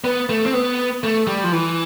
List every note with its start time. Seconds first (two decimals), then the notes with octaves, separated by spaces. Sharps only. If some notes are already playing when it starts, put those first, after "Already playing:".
0.04 B3
0.29 A3
0.46 C4
0.54 B3
1.04 A3
1.27 G3
1.44 F3
1.52 E3